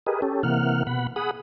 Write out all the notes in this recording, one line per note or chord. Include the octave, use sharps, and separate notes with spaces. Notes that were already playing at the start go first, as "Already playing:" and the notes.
G4 G#4 A#4 B4 D#5
C#4 G4 A4
C3 E3 A#3 F#5 F6
B2 F#5 B5
G#4 F#5 B5 D#6